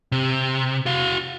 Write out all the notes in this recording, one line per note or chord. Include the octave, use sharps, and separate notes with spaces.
C3
F#4 F5